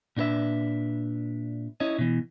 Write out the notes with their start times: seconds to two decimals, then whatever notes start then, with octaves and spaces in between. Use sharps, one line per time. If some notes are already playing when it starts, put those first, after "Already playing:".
0.17 A#2 D4 F4 B4 E5
1.80 C#4 E4 C#5 D#5
1.99 B2 E3